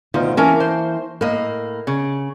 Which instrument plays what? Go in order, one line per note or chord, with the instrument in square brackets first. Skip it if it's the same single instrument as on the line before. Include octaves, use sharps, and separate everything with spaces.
[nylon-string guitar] D2 B2 F4 [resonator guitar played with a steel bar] D#3
[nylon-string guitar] E3 A#3 A5 [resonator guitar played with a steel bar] C#4 A#4 G#5
[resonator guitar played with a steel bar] C5
[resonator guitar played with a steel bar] A2 A#3 [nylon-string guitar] A#4 D#5
[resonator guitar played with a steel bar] C#3